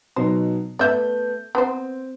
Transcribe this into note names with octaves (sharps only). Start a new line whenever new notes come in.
B2 F#3 D#4 C5
A3 B3 D5 E5 G6
B3 C4 C5